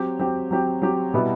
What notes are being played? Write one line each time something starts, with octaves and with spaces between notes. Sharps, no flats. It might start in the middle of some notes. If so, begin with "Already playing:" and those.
Already playing: F#3 C4 G4
F#3 C4 G4
F#3 C4 G4
F#3 C4 G4
B2 G3 B3 E4